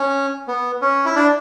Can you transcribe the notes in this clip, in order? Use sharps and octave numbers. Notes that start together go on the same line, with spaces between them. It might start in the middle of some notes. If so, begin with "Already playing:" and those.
Already playing: C#4
B3
C#4
E4
D4